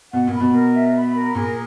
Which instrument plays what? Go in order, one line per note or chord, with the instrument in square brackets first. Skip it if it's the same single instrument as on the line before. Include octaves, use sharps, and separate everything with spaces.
[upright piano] B2 [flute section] F#5
[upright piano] A#2
[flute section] B5
[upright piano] B2
[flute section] A#4
E5
B5
A#4
[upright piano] A#2 [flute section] G#4